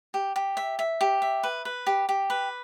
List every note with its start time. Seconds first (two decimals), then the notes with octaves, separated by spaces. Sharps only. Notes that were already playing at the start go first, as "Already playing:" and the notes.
0.14 G4
0.36 G4
0.57 E5
0.79 E5
1.01 G4
1.22 E5
1.43 B4
1.65 B4
1.86 G4
2.09 G4
2.30 B4